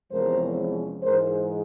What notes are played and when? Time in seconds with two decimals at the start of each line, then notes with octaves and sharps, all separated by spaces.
0.11 E2 C3 F3 G#3 C#4 A#4 C5
1.02 G#2 E3 G#3 A#4 C5